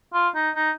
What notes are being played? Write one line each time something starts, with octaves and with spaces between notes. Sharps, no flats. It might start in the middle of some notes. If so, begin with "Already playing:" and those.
F4
D#4
D#4